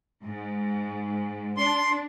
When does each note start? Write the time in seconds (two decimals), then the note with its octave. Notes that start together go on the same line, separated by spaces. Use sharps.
0.22 G#2
1.57 D4 C6